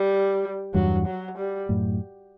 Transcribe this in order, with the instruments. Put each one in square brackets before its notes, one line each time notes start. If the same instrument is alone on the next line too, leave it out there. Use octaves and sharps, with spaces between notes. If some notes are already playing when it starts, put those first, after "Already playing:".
Already playing: [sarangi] G3
[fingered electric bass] E2 G2 [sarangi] F#3
[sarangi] F#3
G3
[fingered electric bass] F#2 A2